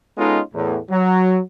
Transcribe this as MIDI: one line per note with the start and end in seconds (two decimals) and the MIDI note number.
0.18 0.40 56
0.18 0.40 59
0.18 0.40 61
0.18 0.40 63
0.18 0.40 65
0.18 0.40 69
0.54 0.77 40
0.54 0.77 45
0.90 1.39 54